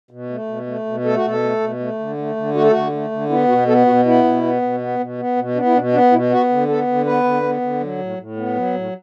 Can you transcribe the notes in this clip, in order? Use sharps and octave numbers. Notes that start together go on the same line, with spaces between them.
B2
A3
B2
A3
B2
A3 A4
F#4
B2 A4
A3
B2
A3
D3
A3
D3
A3 F#4
A4
D3 F#4
A3
D3
B3 E4
B2 F#4
B3 A4
B2 F#4
B3 E4
B2
B3
B2
B3
B2
B3
B2
B3 D4
E4
B2 D4
B3 D4
B2 E4
B3 F#4
D3
B3 A4
D3
B3 B4
D3
B3
D3
F#3
A2
A2
B3
F#3
A2